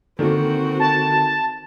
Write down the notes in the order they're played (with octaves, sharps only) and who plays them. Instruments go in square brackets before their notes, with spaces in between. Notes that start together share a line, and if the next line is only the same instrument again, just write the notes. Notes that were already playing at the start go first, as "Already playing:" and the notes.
[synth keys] D3 A4 [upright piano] D#3 A#3 [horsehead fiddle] C4 F#4
[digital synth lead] A5